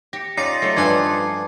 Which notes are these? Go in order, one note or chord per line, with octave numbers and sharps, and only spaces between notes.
G4 A#6 C#7
C#4 D#4 F4 D5
F#3 A3
G2 F3 A4 B4 G#5 A5 D6 G#6